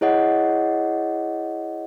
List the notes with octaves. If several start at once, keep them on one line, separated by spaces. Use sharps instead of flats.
E4 G#4 C#5 D#5 F#5